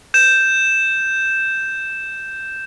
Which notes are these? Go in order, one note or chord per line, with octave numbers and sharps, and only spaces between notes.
G6 E7